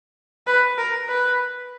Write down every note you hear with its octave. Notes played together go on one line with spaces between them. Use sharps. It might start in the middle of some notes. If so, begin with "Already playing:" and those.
B4
A#4
B4